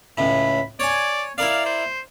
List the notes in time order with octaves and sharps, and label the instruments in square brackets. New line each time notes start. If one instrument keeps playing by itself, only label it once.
[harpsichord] C#2 A2 [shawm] B5
[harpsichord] C#5 G#5 [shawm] D5
[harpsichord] E4 A#4 D5 [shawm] F5
[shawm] C5